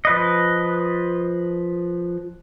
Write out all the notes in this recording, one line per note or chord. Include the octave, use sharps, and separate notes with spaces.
F3 B4 D#5